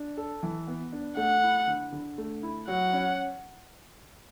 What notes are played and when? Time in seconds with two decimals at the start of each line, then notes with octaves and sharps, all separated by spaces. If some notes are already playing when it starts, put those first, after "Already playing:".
Already playing: D4
0.17 A4
0.43 E3
0.67 B3
0.92 D4
1.17 A3 F#5
1.42 E4
1.68 D3
1.92 D3
2.18 A3
2.43 E4
2.68 F#3 F#5
2.93 C#4